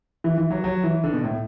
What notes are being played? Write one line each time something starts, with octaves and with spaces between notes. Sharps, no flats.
E3
E3
F#3
F#3
E3
D3
B2
A2